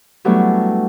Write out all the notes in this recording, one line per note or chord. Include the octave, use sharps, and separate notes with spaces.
F#3 G3 A3 B3 D4 E4